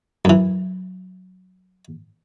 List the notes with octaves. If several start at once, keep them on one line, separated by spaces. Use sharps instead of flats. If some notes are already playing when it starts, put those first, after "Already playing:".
F#2 E3